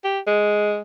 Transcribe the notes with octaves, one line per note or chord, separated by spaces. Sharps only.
G4
G#3